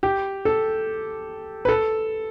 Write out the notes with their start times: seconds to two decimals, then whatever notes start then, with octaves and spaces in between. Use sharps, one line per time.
0.03 G4
0.45 A4
1.65 B4
1.69 A4